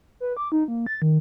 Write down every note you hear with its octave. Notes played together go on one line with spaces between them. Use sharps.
B4
D6
D#4
A#3
A6
D#3